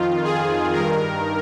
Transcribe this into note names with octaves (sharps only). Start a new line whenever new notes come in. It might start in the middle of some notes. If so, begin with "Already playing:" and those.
Already playing: F2 D#3 F4
G#4
G2 D#3 A#4